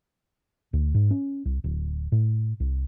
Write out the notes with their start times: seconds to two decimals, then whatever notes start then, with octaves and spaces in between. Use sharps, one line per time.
0.73 D2
0.94 G#2
1.11 C#4
1.45 C2
1.64 D1
2.12 A2
2.60 C2